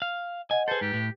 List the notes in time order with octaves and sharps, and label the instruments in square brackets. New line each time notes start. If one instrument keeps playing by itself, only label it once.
[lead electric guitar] F5
[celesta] D#5 F#5 [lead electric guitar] G#5
[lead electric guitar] G#4 A4 [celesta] B4 A6 [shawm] C5
[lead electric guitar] G#2 [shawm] G4
[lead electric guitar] A2